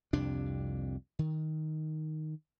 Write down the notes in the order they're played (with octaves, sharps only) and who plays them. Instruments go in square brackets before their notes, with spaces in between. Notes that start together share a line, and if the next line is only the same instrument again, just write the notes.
[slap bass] C2 F2 C3 D4
D#3